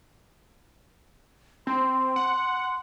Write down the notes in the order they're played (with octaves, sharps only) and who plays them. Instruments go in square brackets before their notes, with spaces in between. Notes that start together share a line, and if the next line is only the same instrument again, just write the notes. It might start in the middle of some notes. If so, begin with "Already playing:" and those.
[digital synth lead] C4 [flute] C6
[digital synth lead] F#5